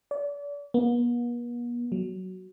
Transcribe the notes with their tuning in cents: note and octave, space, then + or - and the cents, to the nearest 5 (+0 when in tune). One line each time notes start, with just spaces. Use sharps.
D5 -35
B3 -45
F#3 +10